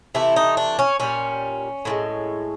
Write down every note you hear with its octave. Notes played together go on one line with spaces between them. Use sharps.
C3 E3 A3 E4
D#4
D4
C#4
A#2 G3 C#4
A2 F3 G#3